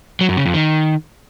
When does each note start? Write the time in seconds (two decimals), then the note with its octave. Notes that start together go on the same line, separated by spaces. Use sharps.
0.21 F#3
0.29 F#2
0.37 C#3
0.46 F2
0.54 D#3